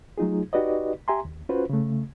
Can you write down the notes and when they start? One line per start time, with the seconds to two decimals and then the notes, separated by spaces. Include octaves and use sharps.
0.18 F#3 A3 D#4 F4 G#4
0.53 D#4 F#4 G4 B4 D5 D#5
1.08 G4 E5 G#5 A#5 C6
1.25 D#2
1.49 C#4 F4 F#4 B4 C5
1.69 C#3 A3